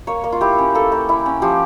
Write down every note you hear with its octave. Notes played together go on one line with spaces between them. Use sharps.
A#3 C#5
A#3
F4
E4 G4
C#4
A#3 A4
A#3
E4
C#4
F3 G4